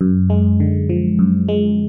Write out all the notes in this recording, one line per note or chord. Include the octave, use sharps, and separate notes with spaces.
F#2
G#3
D3
F3
F#2
G#3